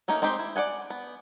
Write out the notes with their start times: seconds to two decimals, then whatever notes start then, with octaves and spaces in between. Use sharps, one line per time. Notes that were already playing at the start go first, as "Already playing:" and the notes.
0.08 A3 A#3 C#4 D#4
0.22 G#3 C4 D#4 G4 C5
0.39 E4
0.56 D5 D#5 F#5 G#5
0.90 B3